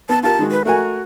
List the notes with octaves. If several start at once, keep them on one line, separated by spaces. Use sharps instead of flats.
B3 A5
F4 G4 A#4 A5
D#3 G#3 F#4
B4
A3 F#4 A#4 G#5